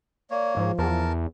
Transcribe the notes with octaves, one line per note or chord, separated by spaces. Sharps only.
A#3 C#5 D5
G#2 F3
E2 A#4 A5